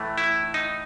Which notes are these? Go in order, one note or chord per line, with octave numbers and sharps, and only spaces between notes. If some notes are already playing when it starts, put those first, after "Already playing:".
Already playing: A2 E3 A3
E4
D#4